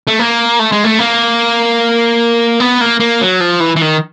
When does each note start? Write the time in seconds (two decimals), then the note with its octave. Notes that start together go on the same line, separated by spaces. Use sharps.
0.07 A3
0.19 A#3
0.59 A3
0.72 G#3
0.84 A3
0.99 A#3
2.60 B3
2.81 A#3
3.00 A#3
3.21 F#3
3.40 F3
3.60 E3
3.76 E3
3.81 D#3